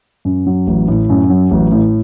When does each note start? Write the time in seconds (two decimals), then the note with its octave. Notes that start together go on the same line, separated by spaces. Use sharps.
0.25 F#2
0.47 F#3
0.67 A1
0.88 A2
1.09 F#2
1.30 F#3
1.51 A1
1.72 A2